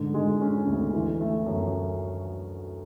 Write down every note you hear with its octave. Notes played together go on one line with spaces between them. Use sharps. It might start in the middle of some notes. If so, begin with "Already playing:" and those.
Already playing: G#2 D3
G#3
C#4
D2
E3
A3
F#2